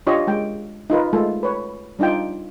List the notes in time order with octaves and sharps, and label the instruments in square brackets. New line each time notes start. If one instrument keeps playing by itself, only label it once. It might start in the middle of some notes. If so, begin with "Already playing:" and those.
[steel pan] D4 F4 G4 C#5 D#5
G#3 G5
D#4 F4 A#4 B4
G#3 A3 F4 A4
B4 C#5
G3 D4 D#4 F4 G5